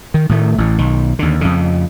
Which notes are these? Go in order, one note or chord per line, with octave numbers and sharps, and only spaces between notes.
D#3
A2 D#3 A3
A1 A2
B1 D#3
D#2 D3
F2 C#3